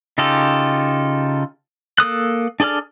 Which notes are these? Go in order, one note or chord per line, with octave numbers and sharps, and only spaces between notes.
C#3 D#4 F4 G4 A4
A#3 A4 D#6 F#6
D4 G#4 A4 D5 F6